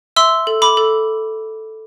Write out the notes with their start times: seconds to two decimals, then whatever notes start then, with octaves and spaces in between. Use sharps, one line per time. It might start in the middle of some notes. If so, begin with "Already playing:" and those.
0.16 E5 C6 E6
0.47 A4
0.62 B5 D6
0.77 A4